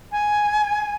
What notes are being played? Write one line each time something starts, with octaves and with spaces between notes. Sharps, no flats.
G#5